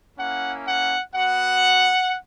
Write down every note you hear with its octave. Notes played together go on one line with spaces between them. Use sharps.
A#3 C#4 E4 F#5
F#5
B3 F#4 F#5